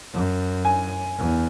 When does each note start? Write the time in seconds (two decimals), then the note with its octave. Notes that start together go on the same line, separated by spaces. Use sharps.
0.13 F#2
0.65 G#5
1.18 E2